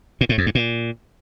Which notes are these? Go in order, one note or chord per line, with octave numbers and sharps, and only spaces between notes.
A#2
A2
F2
G2
A#2